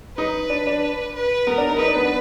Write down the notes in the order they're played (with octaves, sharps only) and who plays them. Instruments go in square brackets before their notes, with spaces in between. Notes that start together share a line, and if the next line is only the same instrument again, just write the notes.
[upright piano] D#4 [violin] B4
[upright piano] D4
D4
[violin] B4
[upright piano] B3 [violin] A#4
[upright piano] D4
D#4
[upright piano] D#4 [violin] B4
[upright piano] D4
B3
D4